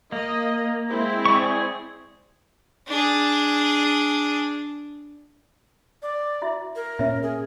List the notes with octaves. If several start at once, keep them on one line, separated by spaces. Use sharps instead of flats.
A#3 D#5
G#3 C4 E4
G#4 D5 C#6
D4 G#4
D5
E4 F#4 E5
A#4
A#2 C#4 E5
G#4